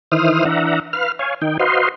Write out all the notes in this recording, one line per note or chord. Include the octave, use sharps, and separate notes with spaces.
D#3 E3 E4 C5 D#6 F6
E3 D4 E5 F#5 A#5
B4 F5 F6
C#5 F5 G#5
D#3 D#4 G5
F#4 B4 C5 D#5 F5 C6